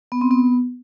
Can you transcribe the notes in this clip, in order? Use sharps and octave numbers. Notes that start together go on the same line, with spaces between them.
B3
C4
B3